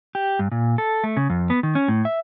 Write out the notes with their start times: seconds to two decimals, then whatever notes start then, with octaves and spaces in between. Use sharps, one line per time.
0.15 G4
0.39 G2
0.51 A#2
0.78 A4
1.04 A3
1.17 C#3
1.30 F2
1.50 B3
1.63 D#3
1.75 C#4
1.88 A2
2.05 E5